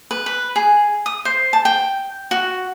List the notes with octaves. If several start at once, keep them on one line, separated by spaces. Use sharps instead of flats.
B4
B4
G#4
D#6
C5
A5
G5
F#4